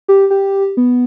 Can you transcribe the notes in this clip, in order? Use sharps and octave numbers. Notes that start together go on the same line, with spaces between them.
G4
G4
B3